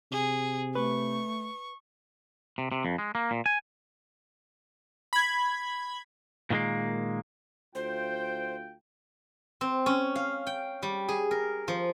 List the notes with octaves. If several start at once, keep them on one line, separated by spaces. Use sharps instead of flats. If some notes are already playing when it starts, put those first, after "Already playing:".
C3 G#4
A3 B4 C#6
C3
C3
F2
G#3
A#3
A#2
G#5
B5 G#6
A#2 D#3 F3 G#3 A#3
D2 F4 C5 G5
C4
C#4
F5
G5
G3
G#4
A#4
F3